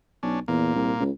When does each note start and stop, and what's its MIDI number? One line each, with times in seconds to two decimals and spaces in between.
0.23 0.39 35
0.23 0.40 61
0.23 0.40 62
0.48 0.74 40
0.48 1.04 46
0.48 1.04 58
0.75 0.93 36
1.00 1.10 37